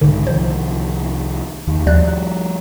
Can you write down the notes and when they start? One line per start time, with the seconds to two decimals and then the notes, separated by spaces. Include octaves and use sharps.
0.01 B1 G#2 D3 D#3
0.27 C2 D#3 F3 C5
1.67 E2 D#3
1.86 D#2 F3 G3 D5 F#6